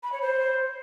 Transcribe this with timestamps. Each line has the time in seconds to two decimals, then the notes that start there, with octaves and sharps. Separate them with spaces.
0.03 B5
0.12 C#5
0.22 C5